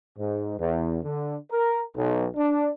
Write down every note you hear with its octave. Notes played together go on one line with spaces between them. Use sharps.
G#2
E2
D3
A#4
B1
D4